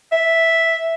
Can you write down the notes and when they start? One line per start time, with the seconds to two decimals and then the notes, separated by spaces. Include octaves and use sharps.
0.12 E5